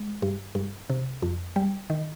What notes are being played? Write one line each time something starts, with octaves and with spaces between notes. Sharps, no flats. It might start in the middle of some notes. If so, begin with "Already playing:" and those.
Already playing: G#3
G2
G2
C3
F2
G3
D#3